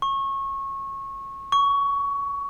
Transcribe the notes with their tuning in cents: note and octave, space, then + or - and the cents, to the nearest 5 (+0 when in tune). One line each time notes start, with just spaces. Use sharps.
C#6 -25
C#6 +20